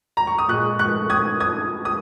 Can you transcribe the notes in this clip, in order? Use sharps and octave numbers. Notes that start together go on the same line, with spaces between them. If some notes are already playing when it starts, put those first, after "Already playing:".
A#5
C#6
D#6
A#2 G#3 C#6 F#6
C#6 F#6
D#6 G#6
D#6 G#6
D#6